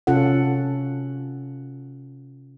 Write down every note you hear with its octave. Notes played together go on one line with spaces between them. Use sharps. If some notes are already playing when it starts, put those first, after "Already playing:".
C3 C#4 F4 A4 F#5